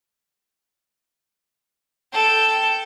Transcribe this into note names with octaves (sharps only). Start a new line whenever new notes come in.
A4 G5